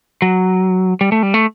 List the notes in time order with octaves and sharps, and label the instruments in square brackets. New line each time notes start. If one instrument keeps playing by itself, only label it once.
[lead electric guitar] F#3
G3
A3
G3
A3